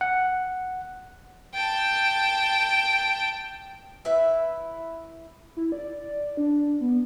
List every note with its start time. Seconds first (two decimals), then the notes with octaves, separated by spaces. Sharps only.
0.01 F#5
1.54 G5 A5
4.05 E4 B4 E5
5.57 E4
5.72 D5
6.37 D4
6.81 B3